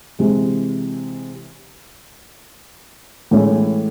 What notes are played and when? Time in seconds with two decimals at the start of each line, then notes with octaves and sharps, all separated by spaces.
0.19 C3 E3 G#3
3.31 A2 E3 G#3 C#4